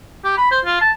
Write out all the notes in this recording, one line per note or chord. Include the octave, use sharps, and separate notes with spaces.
G4
B5
C5
F4
A5